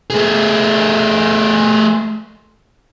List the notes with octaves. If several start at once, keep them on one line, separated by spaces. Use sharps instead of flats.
A3 G#4